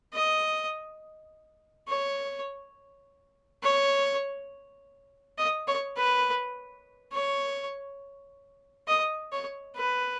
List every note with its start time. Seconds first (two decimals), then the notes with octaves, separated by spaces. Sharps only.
0.13 D#5
1.88 C#5
3.63 C#5
5.38 D#5
5.68 C#5
5.97 B4
7.13 C#5
8.88 D#5
9.32 C#5
9.76 B4